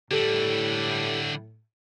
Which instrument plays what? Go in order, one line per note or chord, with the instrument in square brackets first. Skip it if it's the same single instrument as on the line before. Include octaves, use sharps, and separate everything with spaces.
[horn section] A2 [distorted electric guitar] D3 G3 [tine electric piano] G4 A4